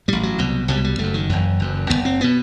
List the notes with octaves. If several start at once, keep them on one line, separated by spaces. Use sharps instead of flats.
A1 A2 G3
F#3
C2 B2
C2 B2 G3
G3
F#1 F#2 A3
D#3
F#1 F#2 E3
F#1 F#2
F#1 F#2 B3
C4
B2 B3